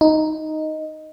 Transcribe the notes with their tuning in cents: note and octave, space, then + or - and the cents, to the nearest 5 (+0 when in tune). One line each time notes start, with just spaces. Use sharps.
D#4 +0